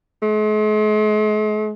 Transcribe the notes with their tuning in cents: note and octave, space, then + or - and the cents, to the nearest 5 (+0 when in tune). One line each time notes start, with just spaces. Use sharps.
G#3 +45